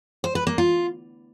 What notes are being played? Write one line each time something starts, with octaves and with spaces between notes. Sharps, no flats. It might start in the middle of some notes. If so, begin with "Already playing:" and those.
C5
B4
A#3
F4